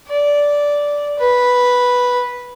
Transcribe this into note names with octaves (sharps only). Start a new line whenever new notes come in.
D5
B4